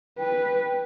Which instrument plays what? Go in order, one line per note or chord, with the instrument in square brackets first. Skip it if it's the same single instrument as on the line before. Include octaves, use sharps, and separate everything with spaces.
[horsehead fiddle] B4 [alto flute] G5